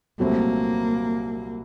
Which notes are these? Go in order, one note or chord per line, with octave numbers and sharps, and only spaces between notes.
C2 A#2 F#3 A3 A#3 C4